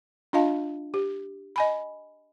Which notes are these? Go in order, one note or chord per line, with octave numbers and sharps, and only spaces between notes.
D4 F4 D#5 F5 A5
G4
D#5 G#5 B5